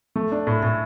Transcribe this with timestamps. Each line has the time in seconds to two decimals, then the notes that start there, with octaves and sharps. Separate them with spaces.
0.16 A3
0.32 D4
0.47 A2
0.63 A2